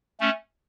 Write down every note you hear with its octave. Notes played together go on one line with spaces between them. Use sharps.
A3 C#4